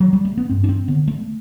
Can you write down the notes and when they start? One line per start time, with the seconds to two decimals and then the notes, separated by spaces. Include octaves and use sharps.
0.00 F#3
0.13 G3
0.25 A3
0.38 B3
0.50 G2 C4
0.64 D4
0.69 C4
0.88 D3 B3
1.08 A3